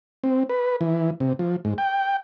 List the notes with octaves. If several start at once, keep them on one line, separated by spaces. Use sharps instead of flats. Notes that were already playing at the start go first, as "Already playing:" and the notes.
C4
B4
E3
C3
F3
G#2
G5